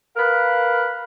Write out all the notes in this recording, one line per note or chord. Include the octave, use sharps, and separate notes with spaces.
A#4 B4 F5